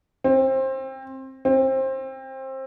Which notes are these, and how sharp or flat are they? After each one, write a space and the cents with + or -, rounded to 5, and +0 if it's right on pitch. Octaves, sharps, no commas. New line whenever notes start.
C4 +25
C4 +25